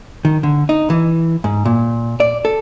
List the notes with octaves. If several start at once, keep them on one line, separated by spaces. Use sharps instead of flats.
D#3
D3
D#4
E3
G#2
A#2
D5
A4